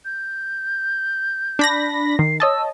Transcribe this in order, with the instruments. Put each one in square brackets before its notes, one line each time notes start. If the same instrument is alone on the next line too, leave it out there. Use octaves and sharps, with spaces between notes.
[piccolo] G6
[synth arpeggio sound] D4 B5 A#6
[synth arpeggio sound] D#3 [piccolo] C7
[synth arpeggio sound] C#5 D#5 A5 [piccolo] E6